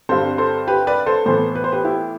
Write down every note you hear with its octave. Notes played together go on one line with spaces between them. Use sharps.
G2 D3 G3 C4 A4 C5
A4 C5
G4 B4
B4 D5
A4 C5
A2 E3 B3 A4 C5
B4
C5
G4 B4
E4 G4